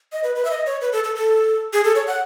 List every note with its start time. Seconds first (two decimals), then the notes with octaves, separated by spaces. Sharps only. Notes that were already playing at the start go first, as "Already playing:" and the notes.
0.12 D#5
0.24 B4
0.35 B4
0.45 E5
0.51 D#5
0.66 C#5
0.81 B4
0.93 A4
1.04 A4
1.16 A4
1.73 G#4
1.84 A4
1.95 C#5
2.07 F#5